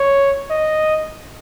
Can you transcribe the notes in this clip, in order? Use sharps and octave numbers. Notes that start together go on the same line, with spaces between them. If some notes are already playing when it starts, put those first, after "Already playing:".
Already playing: C#5
D#5